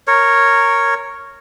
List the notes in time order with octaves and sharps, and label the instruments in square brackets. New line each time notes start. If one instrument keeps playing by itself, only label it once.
[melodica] A#4 C#5